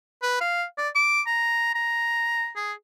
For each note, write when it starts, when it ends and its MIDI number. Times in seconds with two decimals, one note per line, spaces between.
0.23 0.36 71
0.41 0.64 77
0.78 0.89 74
0.95 1.21 86
1.26 1.72 82
1.75 2.49 82
2.56 2.73 68